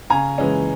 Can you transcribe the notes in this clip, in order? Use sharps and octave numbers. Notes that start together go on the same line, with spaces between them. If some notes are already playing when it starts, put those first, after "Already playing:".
C#3 G#5 A#5
E3 G#3 C#4